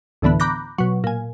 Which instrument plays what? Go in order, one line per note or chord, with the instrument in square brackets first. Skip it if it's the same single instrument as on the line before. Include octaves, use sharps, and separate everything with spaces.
[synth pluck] D2 A2 D3 E3 B3
A#5 B5 D6 F#6 G6 A#6
B2 F#3
A#2 G#5